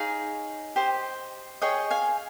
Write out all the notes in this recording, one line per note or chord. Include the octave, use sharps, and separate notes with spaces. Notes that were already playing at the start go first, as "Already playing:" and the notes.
Already playing: D#4 G#4 C#5 F5
G4 C5 D#5
G#4 C#5 D#5 G5
F5 G#5